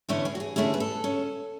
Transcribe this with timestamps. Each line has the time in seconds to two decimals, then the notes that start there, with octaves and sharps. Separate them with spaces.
0.09 E2 D3 A3 C#4 E4 C#5
0.25 G#4
0.35 F#4
0.40 G#4
0.56 E2 D3 A3 C#4 E4 G#4
0.74 B4
0.80 A4
1.04 C#4